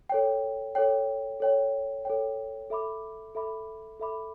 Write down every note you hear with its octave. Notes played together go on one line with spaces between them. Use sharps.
A4 C#5 G5
A4 C#5 G5
A4 C#5 G5
A4 C#5 G5
A4 E5 B5 D6
A4 E5 B5 D6
A4 E5 B5 D6